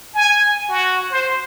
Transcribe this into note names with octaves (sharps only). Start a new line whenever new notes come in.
G#5
F#4
C5